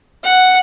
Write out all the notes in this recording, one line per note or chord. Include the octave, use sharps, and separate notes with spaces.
F#5